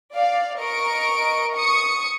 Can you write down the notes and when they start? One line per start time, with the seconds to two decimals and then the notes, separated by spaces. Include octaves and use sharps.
0.13 D5 F5
0.58 A#4 D#5 C#6 D7
1.56 C#6 D#6 C#7